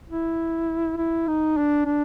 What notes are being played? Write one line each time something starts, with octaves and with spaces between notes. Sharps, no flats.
E4
E4
D#4
D4
D4